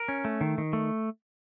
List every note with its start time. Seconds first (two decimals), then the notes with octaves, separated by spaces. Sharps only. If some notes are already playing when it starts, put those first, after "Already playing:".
Already playing: A#4
0.08 C#4
0.25 A3
0.41 D#3
0.58 D#3
0.73 A3